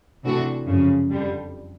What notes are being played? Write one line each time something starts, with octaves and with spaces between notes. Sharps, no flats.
C3 E3 A3 D4 F#4
F#2 C#3 F3
F2 D3 G3